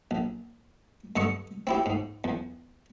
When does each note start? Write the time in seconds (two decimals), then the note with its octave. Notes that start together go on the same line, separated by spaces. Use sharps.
0.11 A#1
1.16 G2 D3 D#5 C#6
1.67 C4 E4 G4
1.86 G#2
2.24 E2